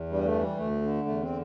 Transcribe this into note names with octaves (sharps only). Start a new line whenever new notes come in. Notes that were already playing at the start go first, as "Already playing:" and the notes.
Already playing: E2
G2 G3
A3
E3
G3
D2 A3
D3
E2 A3
C4
D3